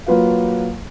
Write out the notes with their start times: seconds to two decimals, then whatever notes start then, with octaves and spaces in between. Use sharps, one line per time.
0.06 F#3 A#3 F4 B4 F5